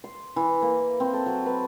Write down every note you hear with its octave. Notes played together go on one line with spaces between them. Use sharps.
C6
E3
A#3
C4
A4
F#3
B4